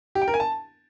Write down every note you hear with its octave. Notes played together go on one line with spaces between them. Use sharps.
G4
G5
A#4
G#5
A5